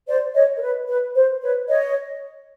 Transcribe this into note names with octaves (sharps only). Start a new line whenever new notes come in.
C5 D5
C#5 D#5
A#4
B4
B4
C5
B4 C#5
C#5 D#5